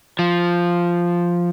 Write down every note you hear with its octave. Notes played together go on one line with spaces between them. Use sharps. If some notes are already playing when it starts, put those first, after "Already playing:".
F3